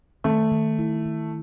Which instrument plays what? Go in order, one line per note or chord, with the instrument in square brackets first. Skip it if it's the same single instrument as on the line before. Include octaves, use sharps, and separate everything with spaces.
[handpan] D#3 [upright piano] A3
[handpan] D#3
E4
D#3